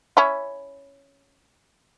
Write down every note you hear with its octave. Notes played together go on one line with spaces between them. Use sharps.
C#4 E4